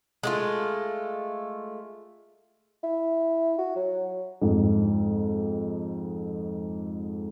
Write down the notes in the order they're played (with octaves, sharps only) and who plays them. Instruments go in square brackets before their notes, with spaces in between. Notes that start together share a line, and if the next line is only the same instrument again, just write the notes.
[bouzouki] G#3 A3 F4
[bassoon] E4
F#4
F#3
[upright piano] F2 G#2